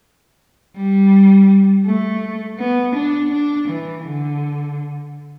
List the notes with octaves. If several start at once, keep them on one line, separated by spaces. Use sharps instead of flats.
G3
A3
B3
D4
D4
E3
D3